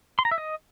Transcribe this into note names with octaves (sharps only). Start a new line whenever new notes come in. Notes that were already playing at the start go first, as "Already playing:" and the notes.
C6
A#5
E5
D#5